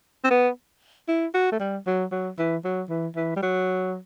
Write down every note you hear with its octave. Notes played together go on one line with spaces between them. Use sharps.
C4
B3
E4
F#4
A3
G3
F#3
F#3
E3
F#3
E3
E3
G3
F#3